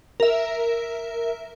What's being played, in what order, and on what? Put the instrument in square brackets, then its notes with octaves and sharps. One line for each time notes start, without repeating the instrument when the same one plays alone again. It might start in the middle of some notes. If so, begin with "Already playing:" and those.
[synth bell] A#4 E5